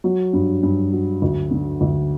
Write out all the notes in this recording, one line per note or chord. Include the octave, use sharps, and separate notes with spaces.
F#3
G2
G2
F#3
D2
D3
D2